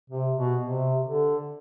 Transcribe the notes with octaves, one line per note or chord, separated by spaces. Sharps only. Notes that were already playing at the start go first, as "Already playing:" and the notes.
C3
B2
C3
D3